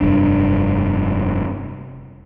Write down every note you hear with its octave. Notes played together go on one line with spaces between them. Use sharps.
F1 G2 D4